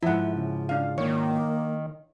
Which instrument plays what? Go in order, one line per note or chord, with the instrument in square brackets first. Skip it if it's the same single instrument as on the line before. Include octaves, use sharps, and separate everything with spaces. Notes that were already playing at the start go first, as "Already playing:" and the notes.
[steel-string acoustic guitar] G#2 F3 [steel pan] E4 F#5 [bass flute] E5
[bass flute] C#3
[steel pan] D4 F5
[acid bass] D#3 [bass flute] A#3 [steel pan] C#5